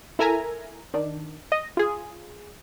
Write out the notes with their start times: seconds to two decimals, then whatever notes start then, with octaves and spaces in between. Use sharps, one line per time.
0.19 E4 A4 A#4 E5 G#5 A#5
0.94 D#3 D4
1.52 D#5
1.77 F4 G#4